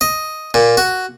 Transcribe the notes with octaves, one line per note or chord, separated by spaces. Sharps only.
D#5
A#2
F#4